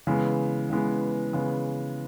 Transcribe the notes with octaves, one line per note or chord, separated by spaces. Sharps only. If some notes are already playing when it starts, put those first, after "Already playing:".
C#3 E3 G#3 B3
C#3 E3 G#3 B3
C#3 E3 G#3 B3